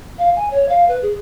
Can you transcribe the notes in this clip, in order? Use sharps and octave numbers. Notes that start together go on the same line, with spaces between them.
F5
G#5
C#5
F5
B4
G#4